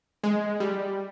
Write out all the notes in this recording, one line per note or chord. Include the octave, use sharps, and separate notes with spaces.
G#3
G3